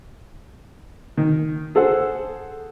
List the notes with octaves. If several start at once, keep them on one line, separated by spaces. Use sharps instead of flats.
D#3
G#4 A4 C5 F#5